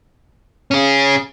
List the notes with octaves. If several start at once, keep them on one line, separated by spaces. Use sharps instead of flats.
C#4 G#4